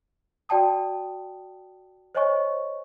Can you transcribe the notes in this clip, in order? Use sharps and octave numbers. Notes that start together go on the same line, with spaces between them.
F#4 D5 G5 A5 D#6
C5 C#5 D#5 G#5 C#6